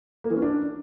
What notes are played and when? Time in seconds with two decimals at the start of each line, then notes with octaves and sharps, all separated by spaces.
0.24 A#3
0.30 E3
0.36 C#4
0.42 D4